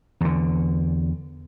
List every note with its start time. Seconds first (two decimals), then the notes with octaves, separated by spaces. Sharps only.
0.21 E2 D3